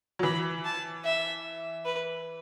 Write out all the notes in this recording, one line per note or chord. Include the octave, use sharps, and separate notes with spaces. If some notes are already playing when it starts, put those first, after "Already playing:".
F#3
E3 B5
A5
E5
B4